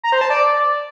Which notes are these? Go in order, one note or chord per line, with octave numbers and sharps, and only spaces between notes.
A#5
C5
A5
D5